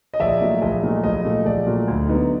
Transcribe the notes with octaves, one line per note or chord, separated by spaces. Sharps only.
D#5
A#1 D5 E5
A#2 F#3 A3
A#1 D#5
A#2 F#3 A3
A#1 D#5
A#2 F#3 A3
A#1 D5
A#2 F#3 A3
D2
D3 F#3 B3 D#4